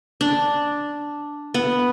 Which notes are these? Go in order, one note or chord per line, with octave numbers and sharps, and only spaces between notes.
D4
B3